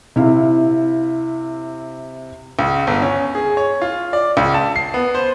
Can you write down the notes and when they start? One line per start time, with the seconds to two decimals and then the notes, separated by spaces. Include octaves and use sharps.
0.16 C3 E4 F5
2.59 C#2
2.87 G1
3.02 C#4
3.35 G#4
3.57 C#5
3.82 F4
4.13 D5
4.37 C#2
4.54 A5
4.76 C7
4.94 B3
5.15 C5